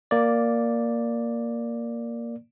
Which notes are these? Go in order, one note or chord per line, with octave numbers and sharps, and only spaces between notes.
A#3 D5